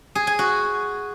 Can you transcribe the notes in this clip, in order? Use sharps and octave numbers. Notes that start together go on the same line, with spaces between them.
G#4
G#5
F#4